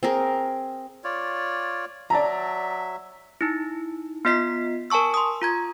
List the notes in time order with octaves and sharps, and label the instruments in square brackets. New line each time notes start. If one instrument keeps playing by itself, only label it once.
[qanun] C4 G#4 A#4
[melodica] F4 C#5 D5
[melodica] F#3 E5 [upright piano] D5 A5 A#5
[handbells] D#4 E4
B3 F4 D#5 B6 C7
A#4 G#5 A5 C#6 E6
C6 D#6
F4 A#5 G#6